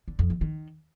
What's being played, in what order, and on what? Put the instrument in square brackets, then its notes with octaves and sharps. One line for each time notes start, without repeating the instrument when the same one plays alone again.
[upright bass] D3
F2
D#3
D#3